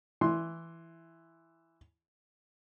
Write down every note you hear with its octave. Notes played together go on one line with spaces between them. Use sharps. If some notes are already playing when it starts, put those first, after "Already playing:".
E3 C6